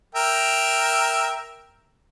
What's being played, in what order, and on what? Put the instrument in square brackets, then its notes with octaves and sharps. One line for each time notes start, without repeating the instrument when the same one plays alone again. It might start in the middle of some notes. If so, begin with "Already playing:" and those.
[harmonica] A#4 E5 G5